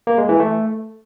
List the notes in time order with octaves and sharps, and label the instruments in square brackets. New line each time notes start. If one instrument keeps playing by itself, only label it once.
[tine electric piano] A#3
G#3
E3
A3